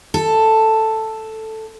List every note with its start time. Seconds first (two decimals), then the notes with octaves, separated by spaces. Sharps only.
0.14 A4